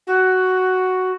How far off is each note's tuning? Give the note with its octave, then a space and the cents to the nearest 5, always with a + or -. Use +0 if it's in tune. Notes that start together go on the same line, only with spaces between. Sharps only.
F#4 +5